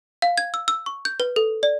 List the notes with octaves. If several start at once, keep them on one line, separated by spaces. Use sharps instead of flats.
F5
G#6
E6
E6
C#6
G6
B4
A4
D5